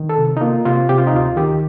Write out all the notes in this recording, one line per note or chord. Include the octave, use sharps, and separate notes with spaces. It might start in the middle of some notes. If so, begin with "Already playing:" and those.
Already playing: D#3
A4
C3
D#4
A#3 F4
C3 F4
C3 G4
F4
D#4
D2 F4
D#3 G4